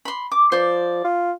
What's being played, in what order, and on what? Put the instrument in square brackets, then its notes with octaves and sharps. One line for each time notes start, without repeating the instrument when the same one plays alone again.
[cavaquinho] B5 C6
D6
[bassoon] F3 [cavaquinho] C5 D5
[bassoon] F4